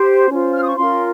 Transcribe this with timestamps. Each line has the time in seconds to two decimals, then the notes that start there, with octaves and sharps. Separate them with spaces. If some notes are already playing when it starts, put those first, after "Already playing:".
Already playing: G4 C5
0.30 C#4 F4 C5
0.54 F6
0.62 D#6
0.68 C#6
0.76 C#4 F4 A#4 C6